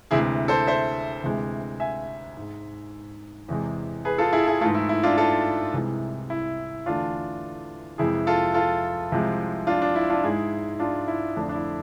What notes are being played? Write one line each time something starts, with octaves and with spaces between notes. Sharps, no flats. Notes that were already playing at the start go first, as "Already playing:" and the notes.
D2 C3 E3 G#3 E4 G#4
A4 C5
C5 E5
D2 C3 E3 G#3
E5 G#5
G#2 G#3
E2 C3 G#3
G#4 B4
F4 A4
E4 G#4
E4 G#4
G#2 E3 A3 F4 A4
E4
E4
D4 F4
F4 A4
C2 C3 E3 G#3
E4
E2 D3 A3 D4 F4
F2 C3 E3 G#3 E4 G#4
F4 A4
F4 A4
C2 C3 F3 G#3
D4 F4
D4
E4
D4 F4
G#2 G#3 E4 G#4
D4 F4
E4
F2 D3 A3 D4
D4
E4